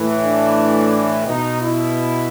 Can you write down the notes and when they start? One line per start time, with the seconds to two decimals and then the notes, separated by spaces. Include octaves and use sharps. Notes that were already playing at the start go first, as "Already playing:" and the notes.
Already playing: A2 E3
0.22 D4
1.27 B2 D#4
1.61 E4